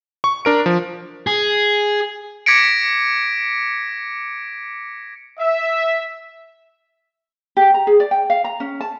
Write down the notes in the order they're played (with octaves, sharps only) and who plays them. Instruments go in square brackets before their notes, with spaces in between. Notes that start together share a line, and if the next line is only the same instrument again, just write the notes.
[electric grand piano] C#6
D4 A#4 D7
F3
[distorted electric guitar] G#4
[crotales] D6 G#6 A#6 B6 C#7 D7
[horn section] E5
[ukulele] G4
A#5
G#4
D5
G5
F5
A#5
C#4
A5